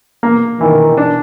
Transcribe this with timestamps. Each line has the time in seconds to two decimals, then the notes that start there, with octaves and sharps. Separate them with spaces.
0.23 A#3
0.60 D#3 E3
0.97 D4